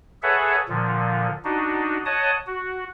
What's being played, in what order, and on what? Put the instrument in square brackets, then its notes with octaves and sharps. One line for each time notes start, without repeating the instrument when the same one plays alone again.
[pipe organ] G#4 A4 B4 C#5 E5 F#5
A#2 D3 F3
D4 D#4 F#4
C#5 D#5 F#5 A5 D#6
F#4